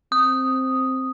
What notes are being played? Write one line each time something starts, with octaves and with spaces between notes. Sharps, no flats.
C4 D#6